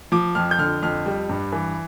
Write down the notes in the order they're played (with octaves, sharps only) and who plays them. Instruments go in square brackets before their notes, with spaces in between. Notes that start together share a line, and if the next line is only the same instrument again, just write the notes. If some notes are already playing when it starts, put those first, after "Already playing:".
[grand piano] F3 D6
F2 F6
G6
D3 F6
F2 F6
G3
G2
E3